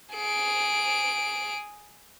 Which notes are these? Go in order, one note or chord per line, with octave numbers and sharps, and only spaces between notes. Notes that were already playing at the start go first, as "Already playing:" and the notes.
G#4 D7